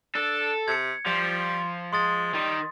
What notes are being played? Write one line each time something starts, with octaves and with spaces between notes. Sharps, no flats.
D4 A4
C3 G#6 C#7
F3 G3
G#3 C6 D#6 A6
D#3 G3